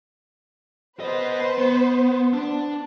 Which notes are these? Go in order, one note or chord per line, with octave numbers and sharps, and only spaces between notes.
B3 B4 C5 D#5
B3
D4